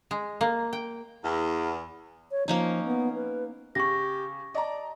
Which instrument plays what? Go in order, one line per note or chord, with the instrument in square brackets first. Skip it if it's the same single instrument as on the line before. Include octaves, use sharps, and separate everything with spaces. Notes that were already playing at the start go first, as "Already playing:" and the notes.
[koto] G#3
A#3
G5
[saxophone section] E2
[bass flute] C#5
[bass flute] F3 [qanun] A#3 C#4 D#4
[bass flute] B3
B4
[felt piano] C#3 [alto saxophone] G4 [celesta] C#6 A#6
[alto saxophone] D5 [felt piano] D#5 A5 A#5